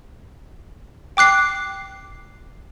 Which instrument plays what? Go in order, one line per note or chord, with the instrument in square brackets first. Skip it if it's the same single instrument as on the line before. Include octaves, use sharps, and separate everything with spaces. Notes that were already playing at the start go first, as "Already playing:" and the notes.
[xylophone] G5 D6 F#6 C7